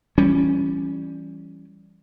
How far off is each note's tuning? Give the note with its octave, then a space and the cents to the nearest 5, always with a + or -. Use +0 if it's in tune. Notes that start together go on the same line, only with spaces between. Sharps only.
E3 +30 G3 +0 C#4 +0